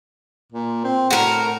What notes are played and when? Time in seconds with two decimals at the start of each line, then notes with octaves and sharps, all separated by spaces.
0.52 A#2
0.84 C4
1.11 A2 F#4 A#4